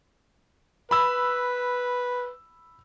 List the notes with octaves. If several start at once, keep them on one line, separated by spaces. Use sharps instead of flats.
B4 B5 E6